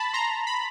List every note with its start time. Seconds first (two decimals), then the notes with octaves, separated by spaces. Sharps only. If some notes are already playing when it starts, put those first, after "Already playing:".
Already playing: A5 B5
0.13 A#5 C6
0.47 B5